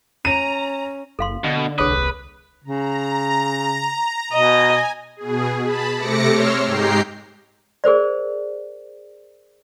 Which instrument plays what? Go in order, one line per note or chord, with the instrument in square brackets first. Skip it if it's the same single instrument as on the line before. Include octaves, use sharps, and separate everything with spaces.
[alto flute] C#4 [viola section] A#5 [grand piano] D#7
[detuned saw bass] F#1 [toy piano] A4 F5 C6
[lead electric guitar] B2 [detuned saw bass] D3
[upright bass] D#1 C2 [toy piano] G#4 C#5 D#6 [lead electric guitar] B4
[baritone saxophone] C#3 [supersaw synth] A#5
[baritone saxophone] B2 [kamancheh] D#5 [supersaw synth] G#5
[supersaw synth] B2 G#4
A5 B5
C3 A3 D6 A#6 C#7
C#5 C6 E6 F6
G#2 G#3 G4 G5 A#5 C7
[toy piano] G#4 A#4 C5 D5